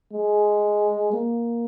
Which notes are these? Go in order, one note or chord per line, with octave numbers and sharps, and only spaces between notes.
G#3
A#3